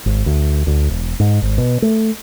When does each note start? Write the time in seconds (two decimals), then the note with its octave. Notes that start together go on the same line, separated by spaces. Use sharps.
0.06 G#1
0.26 D2
0.67 D2
0.89 E1
1.20 G#2
1.42 G#1
1.58 B2
1.82 A3